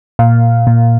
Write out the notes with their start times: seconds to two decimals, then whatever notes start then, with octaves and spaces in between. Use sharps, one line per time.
0.19 A#2 F5
0.67 A#2